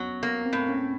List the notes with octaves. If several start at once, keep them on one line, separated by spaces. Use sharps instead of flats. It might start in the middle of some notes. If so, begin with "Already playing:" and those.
Already playing: F#3 B3 C#4
A#3 B3
C4
A2
C#4